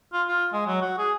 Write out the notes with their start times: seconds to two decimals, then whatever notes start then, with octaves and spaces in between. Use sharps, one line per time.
0.13 F4
0.28 F4
0.53 G#3
0.67 F#3
0.82 F#4
0.98 G#4